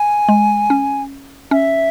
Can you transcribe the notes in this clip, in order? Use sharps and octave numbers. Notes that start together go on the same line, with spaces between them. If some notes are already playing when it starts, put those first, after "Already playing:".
Already playing: G#5
G#3
C#4
C#4 E5